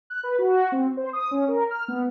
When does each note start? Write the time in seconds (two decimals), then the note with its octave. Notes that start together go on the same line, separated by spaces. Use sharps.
0.10 F#6
0.23 B4
0.39 F#4
0.72 C4
0.97 C5
1.13 D#6
1.31 C#4
1.48 A#4
1.71 F6
1.88 B3